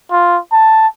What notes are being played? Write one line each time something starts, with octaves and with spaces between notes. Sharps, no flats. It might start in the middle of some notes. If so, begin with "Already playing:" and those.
F4
A5